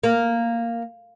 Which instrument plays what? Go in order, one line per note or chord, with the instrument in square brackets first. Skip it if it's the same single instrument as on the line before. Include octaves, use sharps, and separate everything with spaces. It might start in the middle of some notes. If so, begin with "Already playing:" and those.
[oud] A#3